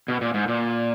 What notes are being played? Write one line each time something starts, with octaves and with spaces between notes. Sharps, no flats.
B2
A#2
G#2
A#2